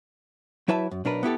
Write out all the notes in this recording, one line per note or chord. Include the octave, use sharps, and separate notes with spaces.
F#3 E4 B4 E5 A5
F#2
B1 D4 A#4 B4
B3 E4 G4 A4